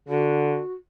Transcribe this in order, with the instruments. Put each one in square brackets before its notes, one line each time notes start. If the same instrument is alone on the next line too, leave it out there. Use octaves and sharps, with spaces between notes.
[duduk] D3 [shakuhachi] F#4